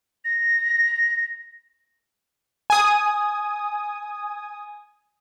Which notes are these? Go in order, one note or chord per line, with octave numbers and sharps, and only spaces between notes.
A#6
G#5 D#6